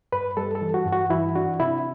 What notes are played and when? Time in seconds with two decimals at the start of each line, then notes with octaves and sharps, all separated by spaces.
0.12 G2 B4
0.37 G3 A4
0.55 A4
0.62 E3
0.74 F#4
0.86 G2
0.92 F#4
1.10 E3 E4
1.35 D4 F#4
1.60 C3 E4